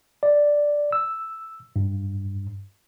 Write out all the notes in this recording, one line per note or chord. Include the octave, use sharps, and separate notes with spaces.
D5
E6
G2